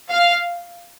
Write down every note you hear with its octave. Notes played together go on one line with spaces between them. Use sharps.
F5